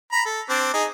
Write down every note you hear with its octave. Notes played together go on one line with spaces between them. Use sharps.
A#5 B5
A4
C4 D4
D#4 G#4